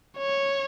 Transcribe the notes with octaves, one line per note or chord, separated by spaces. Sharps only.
C#5